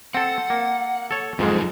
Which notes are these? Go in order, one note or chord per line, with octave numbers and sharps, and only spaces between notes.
C4 A4 F#5
A#3
A4 C#5
F2 G#2 F#3 G#3 D#4 F4